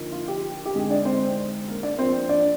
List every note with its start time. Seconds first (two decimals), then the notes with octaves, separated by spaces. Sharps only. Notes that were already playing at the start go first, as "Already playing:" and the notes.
Already playing: D3 F3 A#3 D#4
0.12 F4
0.28 G4
0.65 G4
0.74 D3 G#3 C4 D#4 G#4
0.90 D4 D5
1.05 C4 C5
1.68 A#3 A#4
1.83 D4 D5
1.98 F3 A#3 C4 D4 C5
2.29 D4 D5